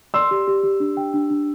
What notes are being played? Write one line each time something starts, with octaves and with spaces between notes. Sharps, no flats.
D5 C6 E6
G4
G4
G4
D4
G5
D4
D4